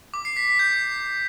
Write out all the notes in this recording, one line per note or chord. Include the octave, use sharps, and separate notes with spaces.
D6
C7
B6
B6
G6